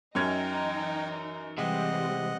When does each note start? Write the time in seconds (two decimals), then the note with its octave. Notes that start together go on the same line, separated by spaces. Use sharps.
0.15 F#2 E3 C#4 D#4 G5 G#6
1.58 C3 E3 G3 G#3 C4 D#5 F#5